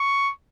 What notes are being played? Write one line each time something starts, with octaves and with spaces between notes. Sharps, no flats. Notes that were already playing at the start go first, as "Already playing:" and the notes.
Already playing: C#6